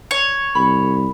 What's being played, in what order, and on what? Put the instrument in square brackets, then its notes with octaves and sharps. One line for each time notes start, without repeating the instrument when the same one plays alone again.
[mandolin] C#5
[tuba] C2 [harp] B5